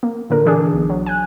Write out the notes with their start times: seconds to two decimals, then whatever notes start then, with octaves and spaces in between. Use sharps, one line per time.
0.03 A#3
0.30 A#2 D3 A#4
0.46 E3 D4 G#4
0.73 B1
0.90 F#3
1.06 G#5 F#6